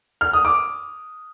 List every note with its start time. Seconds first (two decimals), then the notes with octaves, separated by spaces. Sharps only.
0.21 F6
0.33 D#6
0.45 D6